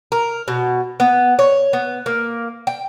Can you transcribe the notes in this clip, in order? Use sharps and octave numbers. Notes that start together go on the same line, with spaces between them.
A#4
B2
B3
C#5
B3
A#3
G5